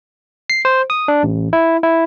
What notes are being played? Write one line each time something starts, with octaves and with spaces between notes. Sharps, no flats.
C7
C5
D#6
D4
A1
E4
E4